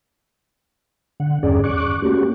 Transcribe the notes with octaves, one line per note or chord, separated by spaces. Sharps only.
D3 F#5
E2 G2 C#4 G#4 D5
C#6 D6 F#6
A3 A#3 C#4 F#4 G4